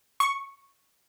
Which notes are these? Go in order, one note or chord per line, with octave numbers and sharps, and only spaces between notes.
C#6